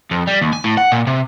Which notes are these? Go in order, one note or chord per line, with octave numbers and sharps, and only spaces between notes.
F2
G3
D#2
G#5
A2
F#5
A#2
C3